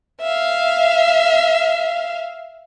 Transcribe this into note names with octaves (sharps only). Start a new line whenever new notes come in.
E5 F5